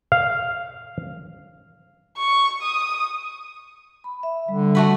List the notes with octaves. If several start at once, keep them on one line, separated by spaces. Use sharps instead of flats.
F5
C#6
D#6
B5
E5
D3 G3
A3 F#4 B4